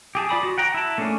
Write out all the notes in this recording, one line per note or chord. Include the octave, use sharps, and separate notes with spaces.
G4 G#4 A5
F4 D5 B5 D#6
F#4
F#5 G5 A#5
E4 A5
A3 A#3 C#4 D4 G#4